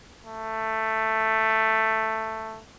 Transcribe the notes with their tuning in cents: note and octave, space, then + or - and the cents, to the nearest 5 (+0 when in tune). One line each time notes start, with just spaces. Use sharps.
A3 +5